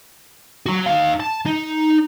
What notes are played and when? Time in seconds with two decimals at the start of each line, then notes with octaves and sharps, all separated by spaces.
0.66 F#4 C#5
0.86 D#4 F5
1.20 A5
1.46 D#4